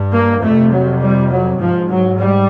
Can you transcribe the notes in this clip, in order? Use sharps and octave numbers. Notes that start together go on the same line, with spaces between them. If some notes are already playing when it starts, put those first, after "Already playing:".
Already playing: G2
A#3
F2 C3 A3
F#3
G3
F#3
G#2 F3
F#3
G3